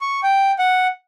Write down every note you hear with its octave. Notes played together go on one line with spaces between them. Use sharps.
C#6
G5
F#5